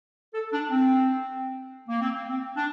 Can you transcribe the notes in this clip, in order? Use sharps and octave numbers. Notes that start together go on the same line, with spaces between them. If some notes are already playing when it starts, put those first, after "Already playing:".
A4
D4
C4
A#3
C4
C4
D4